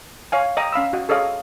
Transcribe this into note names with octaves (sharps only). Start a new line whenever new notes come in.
C#5 F5 G#5
D#5 G5 A#5 D#6
C#4 F5 B5 E6
F#4 D#5
G#4 A4 C#5 D#5 F5